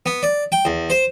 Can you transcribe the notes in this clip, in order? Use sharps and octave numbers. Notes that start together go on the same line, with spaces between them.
B3
D5
G5
E2
C5